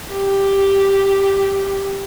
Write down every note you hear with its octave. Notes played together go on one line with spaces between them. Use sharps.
G4